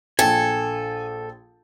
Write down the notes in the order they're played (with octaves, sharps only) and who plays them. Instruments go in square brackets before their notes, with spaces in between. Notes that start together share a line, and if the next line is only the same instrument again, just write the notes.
[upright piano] A#1 G5 [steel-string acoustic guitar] A4 [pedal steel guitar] G#5